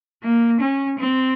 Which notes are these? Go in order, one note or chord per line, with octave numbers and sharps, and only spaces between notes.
A#3
C#4
C4